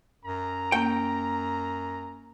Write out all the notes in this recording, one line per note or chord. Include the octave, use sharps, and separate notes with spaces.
F#2 A#5
A#3 C#4 G5